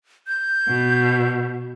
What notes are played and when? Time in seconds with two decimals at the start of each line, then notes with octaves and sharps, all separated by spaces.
0.27 G6
0.68 B2